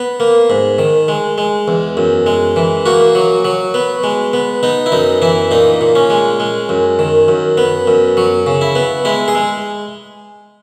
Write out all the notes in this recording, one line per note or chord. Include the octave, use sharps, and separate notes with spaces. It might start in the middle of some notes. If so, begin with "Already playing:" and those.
Already playing: B3
A#3
G#2
D#3
G#3
G#3
E2
F#2
G#3
E3
A#3 F#4
F#3
F#3
B3
G#3
B3
B3 D#4
E4
F#2 D#4
E3 E4
A#2 D#4
A#2
C#4
G#3
G#3
F#2
D#3
F#2
B3
F#2
F#3
C#3
E4
B3
G#3 E4
G#4
G#3